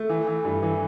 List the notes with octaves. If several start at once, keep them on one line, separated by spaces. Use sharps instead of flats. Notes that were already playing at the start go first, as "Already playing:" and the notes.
Already playing: A3
E3
E3
G2
E3